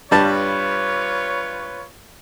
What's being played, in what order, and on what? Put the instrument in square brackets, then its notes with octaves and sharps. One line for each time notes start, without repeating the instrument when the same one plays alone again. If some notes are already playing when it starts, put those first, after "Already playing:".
[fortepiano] G2 G3 A5 [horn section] F4 B4 C#5